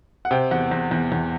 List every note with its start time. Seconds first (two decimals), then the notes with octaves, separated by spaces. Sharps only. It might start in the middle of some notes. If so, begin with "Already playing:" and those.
0.25 F#5
0.31 C3 G5
0.51 E2 F#5
0.71 E2
0.91 E2
1.12 E2